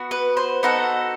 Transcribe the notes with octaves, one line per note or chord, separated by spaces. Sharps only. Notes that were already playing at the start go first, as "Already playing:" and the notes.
Already playing: B3 F#4
B4
C5
B3 D#4 F#4 A4 F#5